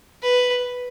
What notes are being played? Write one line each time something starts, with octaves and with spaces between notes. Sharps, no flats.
B4